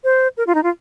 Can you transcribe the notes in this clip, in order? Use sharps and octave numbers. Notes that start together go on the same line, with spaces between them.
C5
A#4
F4
D#4
F4